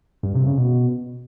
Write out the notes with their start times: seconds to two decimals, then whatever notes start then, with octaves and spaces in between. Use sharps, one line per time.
0.23 G2
0.35 C3
0.46 C#3
0.58 B2